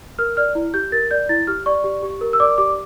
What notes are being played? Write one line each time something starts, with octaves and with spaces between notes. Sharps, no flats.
A#4 F6
D5 F6
E4
G4 G6
A#4 A6
D5 G6
E4 A6
G4 F6
D5 C#6
G4
G4
A#4
E6
D5 D6
G4 D6